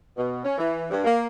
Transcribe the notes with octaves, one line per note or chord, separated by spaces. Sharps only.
B2
C#4
E3
G2
A#3